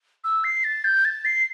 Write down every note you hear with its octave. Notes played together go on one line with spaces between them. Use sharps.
E6
C7
A6
G6
A6
C7